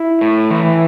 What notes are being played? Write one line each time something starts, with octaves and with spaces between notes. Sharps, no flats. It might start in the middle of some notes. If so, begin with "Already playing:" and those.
Already playing: E4
A2
E3